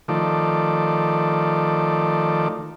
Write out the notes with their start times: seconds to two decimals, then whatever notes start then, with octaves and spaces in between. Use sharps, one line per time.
0.08 D#3 F3 A3 D5